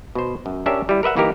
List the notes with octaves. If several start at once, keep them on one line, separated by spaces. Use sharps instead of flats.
B2 C5
F#2
C#4 D4 G4 A#4 E5
G3 E4
A#4 B4 E5 F#5
E3 A#3 D#4 G4 A#4